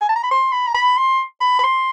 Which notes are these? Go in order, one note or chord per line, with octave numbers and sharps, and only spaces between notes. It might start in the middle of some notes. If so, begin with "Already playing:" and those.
G#5
A5
A#5
B5
C6
B5
A#5
B5
C6
B5
B5
C6